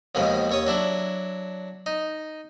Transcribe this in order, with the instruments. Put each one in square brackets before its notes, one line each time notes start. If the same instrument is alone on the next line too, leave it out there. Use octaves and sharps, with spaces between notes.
[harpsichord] D#2 G#2 B2 D#3 F3
D#2 C#5 D#6
F#3 D4 E4
D#4